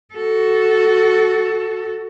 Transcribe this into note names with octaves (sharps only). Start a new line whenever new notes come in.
F#4 A4